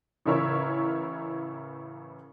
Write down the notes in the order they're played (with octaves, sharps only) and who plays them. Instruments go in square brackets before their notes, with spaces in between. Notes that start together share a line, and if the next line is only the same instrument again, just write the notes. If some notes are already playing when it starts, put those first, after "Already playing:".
[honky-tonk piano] A1 C#3 E4 A#4 C#5 E5